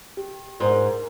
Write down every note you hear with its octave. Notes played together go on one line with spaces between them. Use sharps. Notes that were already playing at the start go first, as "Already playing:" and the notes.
G4
G#2 A#4